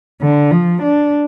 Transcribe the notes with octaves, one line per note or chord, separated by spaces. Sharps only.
D3
F3
D4